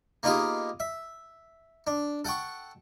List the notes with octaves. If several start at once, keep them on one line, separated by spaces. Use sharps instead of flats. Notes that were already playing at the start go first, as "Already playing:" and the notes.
A#3 B3 D#4 F4 G4 G#4
E5
D4
A4 F#5 G5 C#6